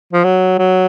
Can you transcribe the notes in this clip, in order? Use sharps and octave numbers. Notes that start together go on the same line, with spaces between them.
F3
F#3
F#3